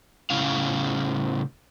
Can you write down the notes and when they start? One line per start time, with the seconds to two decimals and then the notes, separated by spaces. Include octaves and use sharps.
0.30 A2 C#3 C#4 E4 F5